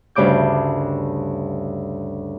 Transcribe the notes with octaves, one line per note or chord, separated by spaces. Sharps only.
D2 G2 C#3 G3 D6 G6